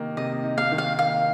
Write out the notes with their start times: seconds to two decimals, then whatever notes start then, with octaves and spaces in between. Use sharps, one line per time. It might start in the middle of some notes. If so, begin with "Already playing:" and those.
Already playing: C3 D#3 A#3 D#4
0.17 C3 D#5
0.44 D#4
0.58 F5
0.72 D#3
0.78 F5
0.98 A#3 F5